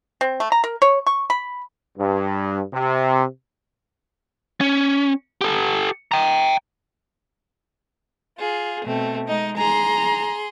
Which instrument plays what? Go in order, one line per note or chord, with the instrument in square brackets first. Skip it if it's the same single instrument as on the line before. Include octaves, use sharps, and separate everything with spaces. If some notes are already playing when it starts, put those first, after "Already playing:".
[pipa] C4
A3
A#5
A#4
C#5
C#6
B5
[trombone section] G2
C3
[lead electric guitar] C#4
G4 A4
G5 A#5
[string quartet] F4 G#4
B2 A3 C4
G#3 D#4 D#5
[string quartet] G#4 C6 [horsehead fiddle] A#5